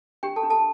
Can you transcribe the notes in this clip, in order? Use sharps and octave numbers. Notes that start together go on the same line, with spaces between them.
D4 G4 G5
A4 A5
D4
A4 A5